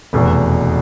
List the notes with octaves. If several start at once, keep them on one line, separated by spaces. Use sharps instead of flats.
F1 E2 B2